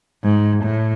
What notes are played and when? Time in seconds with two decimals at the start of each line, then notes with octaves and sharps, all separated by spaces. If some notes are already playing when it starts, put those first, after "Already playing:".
0.24 G#2
0.65 A2